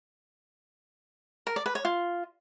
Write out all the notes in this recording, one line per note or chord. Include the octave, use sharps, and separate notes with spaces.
A#4
D5
B4
C#5
F4